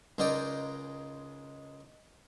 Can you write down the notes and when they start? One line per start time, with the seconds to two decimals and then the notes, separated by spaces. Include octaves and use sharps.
0.18 C#2 G#3 D#4 A#4 D5 G5